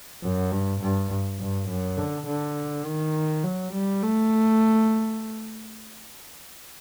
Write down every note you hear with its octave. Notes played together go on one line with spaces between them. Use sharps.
F#2
G2
G2
G2
F#2
D3
D3
D#3
F#3
G3
A3